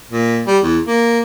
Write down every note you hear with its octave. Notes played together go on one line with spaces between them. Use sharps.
A#2
G3
E2
A#3